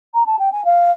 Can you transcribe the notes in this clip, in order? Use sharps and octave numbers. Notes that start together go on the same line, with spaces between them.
A#5
A5
G5
G#5
F5